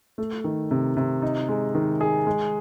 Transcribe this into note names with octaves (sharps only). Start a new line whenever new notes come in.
A3
D#3
C3
C3
D#4
G#3
D#3
G#4
G#3